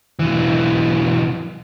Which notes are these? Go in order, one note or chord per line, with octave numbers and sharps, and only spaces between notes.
B1 E3